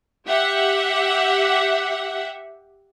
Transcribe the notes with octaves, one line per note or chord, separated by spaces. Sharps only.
G4 E5 F#5